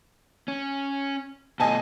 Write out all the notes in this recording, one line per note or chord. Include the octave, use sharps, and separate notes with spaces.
C#4
B2 A3 D#5 G#5 A5